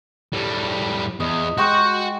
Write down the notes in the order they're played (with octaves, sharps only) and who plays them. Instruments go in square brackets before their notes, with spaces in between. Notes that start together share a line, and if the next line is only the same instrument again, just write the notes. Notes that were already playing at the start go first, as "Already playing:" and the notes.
[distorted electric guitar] A2 G3
[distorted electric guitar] E2 [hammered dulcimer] D#5
[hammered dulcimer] G#3 G5 C#6 [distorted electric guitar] F#4 F#5